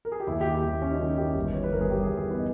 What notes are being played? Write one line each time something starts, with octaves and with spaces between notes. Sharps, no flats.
A#4
G#4
G4
D#2 E4
D#2 G4
E4
D#2
D#2 C#4
D#4
C#4
D#3
D#4
D#3 E4 G4
G1
E3 C#5
B4
G1 A#4
G#4
G2 G4
G#4
G1
G#4
E3 B3
D#4